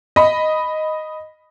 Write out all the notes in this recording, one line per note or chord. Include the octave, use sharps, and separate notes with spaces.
D#5 B5